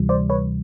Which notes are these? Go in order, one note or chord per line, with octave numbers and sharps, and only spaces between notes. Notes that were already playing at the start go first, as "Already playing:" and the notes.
Already playing: D2 C3 E3 G3
C5 D5
B4 C#5